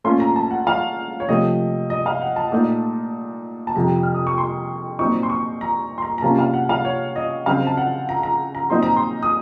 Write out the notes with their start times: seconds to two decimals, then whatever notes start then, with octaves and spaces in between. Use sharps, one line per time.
0.04 A#2 A3 C#4 F4 C6
0.20 A#5
0.36 A5
0.51 F#5
0.67 F5
1.20 C#5
1.28 C3 F3 A3 D#5
1.90 D#5
2.06 F5
2.22 F#5
2.36 A5
2.52 A#2 A3 D#4
3.67 A5
3.76 F2 C3 F3 A#5
4.03 F6
4.14 D#6
4.27 C#6
4.38 C6
4.99 A#2 F#3 C4 D#4 C#6
5.23 C6
5.30 C#6
5.61 A#5
5.98 C6
6.02 A#5
6.18 A#5
6.22 C3 F#3 A#3 C#4 F4 A5
6.39 F5
6.54 F#5
6.69 F5
6.85 C#5
7.16 D#5
7.46 C#3 F#3 C4 F5
7.67 A5
7.77 F#5
8.09 A#5
8.23 A#5
8.55 A#5
8.70 A#2 F#3 C4 D#4 C6
8.83 A#5
8.96 C6
9.23 D#6